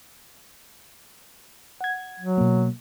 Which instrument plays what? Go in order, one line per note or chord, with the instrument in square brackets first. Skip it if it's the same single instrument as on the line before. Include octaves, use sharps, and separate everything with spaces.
[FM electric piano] F#5 G#6
[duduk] F#3
[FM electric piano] B2 A#3